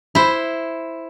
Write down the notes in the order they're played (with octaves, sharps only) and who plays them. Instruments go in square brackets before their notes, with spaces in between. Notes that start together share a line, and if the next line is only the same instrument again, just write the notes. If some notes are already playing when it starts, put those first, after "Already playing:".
[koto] E4 C5